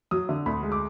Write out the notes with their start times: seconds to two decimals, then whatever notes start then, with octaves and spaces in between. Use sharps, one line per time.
0.11 F#3 D#6
0.29 D3
0.46 D2 B5
0.63 G#3
0.72 D6